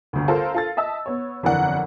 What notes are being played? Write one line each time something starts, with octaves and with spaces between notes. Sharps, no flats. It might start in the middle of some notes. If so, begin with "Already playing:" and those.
G1 D2
F4 A4 A#4 C5
F4 A4 A6
D#5 E5 A5 E6
B3 C#5
G1 F2 E3 A#4 D5 F#5